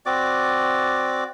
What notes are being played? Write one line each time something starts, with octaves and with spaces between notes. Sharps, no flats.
C4 F#4 D5 D6